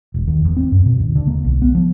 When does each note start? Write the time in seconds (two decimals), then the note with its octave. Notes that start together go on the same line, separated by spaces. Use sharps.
0.14 E1
0.28 D#2
0.45 E2
0.57 C4
0.72 F#2
0.86 B2
0.99 D#2
1.15 D3
1.27 A#3
1.44 B1
1.62 B3
1.75 F3